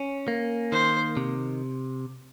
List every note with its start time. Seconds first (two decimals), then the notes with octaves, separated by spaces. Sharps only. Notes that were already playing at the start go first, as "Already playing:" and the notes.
Already playing: C#4
0.28 A#3
0.72 D#3 C5
1.17 C3